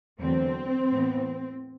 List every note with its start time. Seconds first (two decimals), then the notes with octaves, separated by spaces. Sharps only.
0.20 E2 D3 F#3 A3 C4
0.91 A2 E3 B3